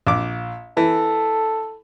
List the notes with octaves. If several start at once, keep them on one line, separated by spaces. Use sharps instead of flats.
A#1 D6
E3 A4